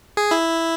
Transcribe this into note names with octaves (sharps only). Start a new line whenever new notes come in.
G#4
E4